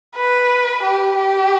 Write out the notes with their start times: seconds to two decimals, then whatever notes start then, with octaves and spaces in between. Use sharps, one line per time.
0.16 B4
0.83 G4
1.16 G4